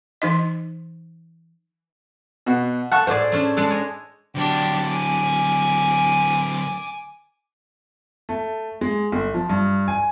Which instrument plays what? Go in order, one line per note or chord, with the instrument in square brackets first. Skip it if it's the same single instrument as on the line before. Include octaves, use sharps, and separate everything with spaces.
[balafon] E3 D#4 D#5
[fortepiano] B2 F#4
[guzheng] A4 [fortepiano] F#5 A5 C#6
[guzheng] A2 G#4 [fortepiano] C5 D5
[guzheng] A3 C#4 D4
G#3 D4 A4
C#5 D#5
[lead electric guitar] D3 F#3 [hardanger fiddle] D4 G4
[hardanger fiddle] G#5 D6
[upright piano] A3
G#3
G1
F3
G2
G#5